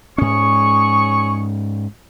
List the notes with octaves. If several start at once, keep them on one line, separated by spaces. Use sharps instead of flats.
G#2 C#4 G#4 C#5 C#6